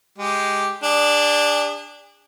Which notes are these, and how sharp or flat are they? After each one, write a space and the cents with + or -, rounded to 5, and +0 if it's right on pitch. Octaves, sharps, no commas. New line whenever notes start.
G#3 +0 G4 +0
D4 +0 G#4 -40